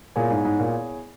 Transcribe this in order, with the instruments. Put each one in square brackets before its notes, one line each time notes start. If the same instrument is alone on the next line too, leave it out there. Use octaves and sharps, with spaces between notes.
[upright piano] A#2 [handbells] B3 E4 G#4 C#5 G#5
[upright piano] G#2
G#2
A#2